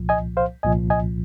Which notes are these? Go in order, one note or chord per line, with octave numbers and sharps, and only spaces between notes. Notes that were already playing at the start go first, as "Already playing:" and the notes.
Already playing: C2 A#2 F3
D#5 G#5
C5 F5
C2 A#2 F3 D#5 G#5
D#5 G#5